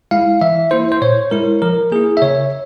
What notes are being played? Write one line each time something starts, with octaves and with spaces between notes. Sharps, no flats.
G#3 E4 F5
E3 E5
A#3 E4 C5
C5
A#2 C#5
G#3 E4 A#4
F3 A#4
A#3 E4 G#4
E5
C#3 C#5